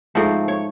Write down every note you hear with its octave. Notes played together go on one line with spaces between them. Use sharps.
G#2 F3 A3 C4
C#5